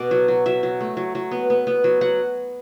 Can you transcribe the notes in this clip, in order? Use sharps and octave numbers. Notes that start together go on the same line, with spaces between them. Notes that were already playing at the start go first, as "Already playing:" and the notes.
Already playing: B2 D5
F#3
F#3
F#3 E5
F#3
A3
F#3
F#3
B3
B3
B3
F#3
F#3 F#5